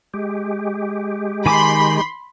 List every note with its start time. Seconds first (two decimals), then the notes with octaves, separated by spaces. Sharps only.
0.14 G#3 G4
1.46 D#3 G#5 B5 C6 D6